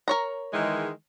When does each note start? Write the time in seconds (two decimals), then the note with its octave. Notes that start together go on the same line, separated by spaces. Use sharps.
0.08 A#4 C#5 A#5
0.53 D#3 E3 G#3